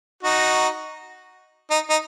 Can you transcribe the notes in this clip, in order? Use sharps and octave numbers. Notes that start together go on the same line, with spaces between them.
D#4 F#4
D#4
D#4